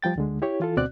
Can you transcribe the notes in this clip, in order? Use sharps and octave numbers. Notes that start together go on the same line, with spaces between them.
F3 G3 G5 A6
D2 D3 G#3
E4 G4 C#5
E3 F4 A4
D2 B2 C4 F#4 D5 F#6